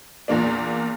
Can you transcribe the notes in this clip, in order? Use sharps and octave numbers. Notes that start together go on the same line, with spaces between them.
E2 A#2 A#3 D4